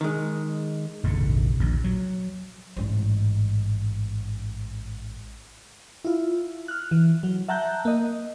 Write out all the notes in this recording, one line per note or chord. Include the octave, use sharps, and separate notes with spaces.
D#3 G#3
F1 A#1 G#2 D3
A#1 D#2
F#3
A1 G#2
E4 F4
F6 F#6
E3
F#3
E5 F#5 A5 A#5 F#6 G6
A#3 D#5